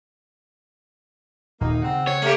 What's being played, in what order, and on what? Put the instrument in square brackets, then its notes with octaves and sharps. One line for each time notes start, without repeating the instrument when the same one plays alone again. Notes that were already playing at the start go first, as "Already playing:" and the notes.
[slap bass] D#1 [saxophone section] A#3 D#4
[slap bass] C#3 [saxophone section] C4 F#5
[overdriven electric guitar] C#5
[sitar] A3 A#3 G4